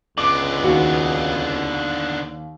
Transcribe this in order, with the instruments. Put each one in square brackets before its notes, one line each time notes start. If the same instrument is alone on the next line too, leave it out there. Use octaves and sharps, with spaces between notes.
[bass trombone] C#2 [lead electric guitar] D3 B3 [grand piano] D6
[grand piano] D#2 [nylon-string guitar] F#4